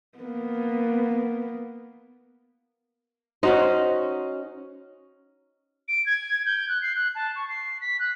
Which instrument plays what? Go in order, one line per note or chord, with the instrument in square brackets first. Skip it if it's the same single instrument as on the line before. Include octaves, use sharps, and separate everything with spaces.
[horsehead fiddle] A#3 B3
[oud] C#4 F#4 C5 [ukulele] D#4
[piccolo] D7
G#6
G6
F#6
C7
F#6
A5
C#6
C7
B6
F#6